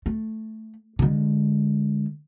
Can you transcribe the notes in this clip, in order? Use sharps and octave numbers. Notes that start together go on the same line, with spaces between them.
A3
D3 G#3